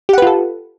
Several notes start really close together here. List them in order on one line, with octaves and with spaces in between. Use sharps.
G4 F#5 B4 F4 A4